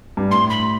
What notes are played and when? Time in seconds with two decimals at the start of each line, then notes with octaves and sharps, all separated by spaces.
0.17 G2
0.30 A2 C6
0.49 B5